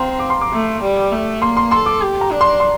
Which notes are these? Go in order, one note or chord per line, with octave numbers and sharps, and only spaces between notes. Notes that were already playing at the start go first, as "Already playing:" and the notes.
Already playing: C4 F5 A#5 C6
D6
C6
D6
A3
G3
A3
A#3 C6
C6
A4 C6
D6
G4
A#5
D4
C6
C6